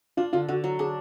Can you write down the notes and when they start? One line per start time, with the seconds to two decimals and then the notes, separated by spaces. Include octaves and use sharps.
0.17 D4 F4
0.33 D3 F4
0.49 D3 F#4
0.64 F#3
0.79 D4 G#4